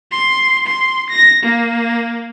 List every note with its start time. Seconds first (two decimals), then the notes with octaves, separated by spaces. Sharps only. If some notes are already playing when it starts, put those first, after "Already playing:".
0.11 C6
0.66 C6
1.10 A#6
1.43 A#3